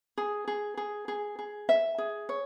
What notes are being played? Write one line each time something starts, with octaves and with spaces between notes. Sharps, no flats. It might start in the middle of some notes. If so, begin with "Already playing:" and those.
G#4
G#4
G#4
G#4
G#4
E5
G#4
C#5